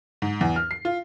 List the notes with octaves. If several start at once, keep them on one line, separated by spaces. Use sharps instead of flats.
G#2
E2
F6
C7
F4